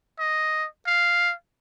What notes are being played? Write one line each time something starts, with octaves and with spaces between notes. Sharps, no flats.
D#5
F5